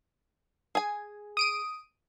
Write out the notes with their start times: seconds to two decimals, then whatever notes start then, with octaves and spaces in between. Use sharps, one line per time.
0.75 G#4 G#5
1.37 D#6 D7 D#7